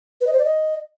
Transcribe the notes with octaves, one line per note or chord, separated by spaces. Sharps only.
B4
D#5
C5
D5
D#5